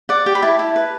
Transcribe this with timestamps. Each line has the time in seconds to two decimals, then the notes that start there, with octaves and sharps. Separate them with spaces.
0.09 D5 F#5
0.26 G4 G5
0.35 B5
0.42 E4 A5
0.59 E4
0.76 B4